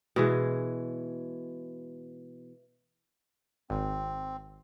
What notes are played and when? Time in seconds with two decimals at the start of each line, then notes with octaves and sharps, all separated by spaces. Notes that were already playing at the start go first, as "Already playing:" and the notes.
0.16 B2 E3 G#3
3.70 G#1 C4